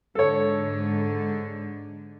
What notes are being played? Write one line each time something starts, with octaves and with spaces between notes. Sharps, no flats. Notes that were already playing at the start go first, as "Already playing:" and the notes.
G#2 D3 A4 C#5